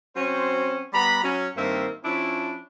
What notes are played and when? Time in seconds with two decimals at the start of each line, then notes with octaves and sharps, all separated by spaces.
0.16 F#3 C4 C#4 C5
0.93 G3 B3 A#5 B5
1.24 F#3 C#4
1.57 G2 D#3 A#3 C4 E5
2.04 F3 C#4 D4 E4